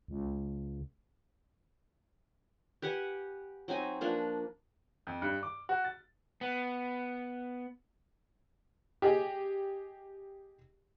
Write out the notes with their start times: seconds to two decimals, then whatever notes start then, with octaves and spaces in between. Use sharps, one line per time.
0.08 C#2
2.82 G4 B4 F#5 G#5
3.68 F#3 C4 D#4 G#5
4.01 F3 A#3 D4 B4
5.07 F2
5.22 G2
5.43 D6
5.69 F#4
5.84 A6
6.41 B3
9.02 G4 G#4 D#5